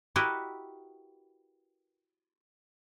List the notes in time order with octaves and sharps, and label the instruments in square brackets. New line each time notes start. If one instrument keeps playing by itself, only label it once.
[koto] E4 F#4 G4 A#4 B4 D#5